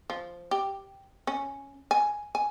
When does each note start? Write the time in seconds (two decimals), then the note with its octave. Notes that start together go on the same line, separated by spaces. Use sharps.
0.10 F3
0.51 G4
1.27 C#4
1.91 G#5
2.35 G#5